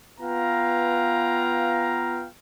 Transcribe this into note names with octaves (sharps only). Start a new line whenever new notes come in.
B3 F4 B4 F5 G5 A#5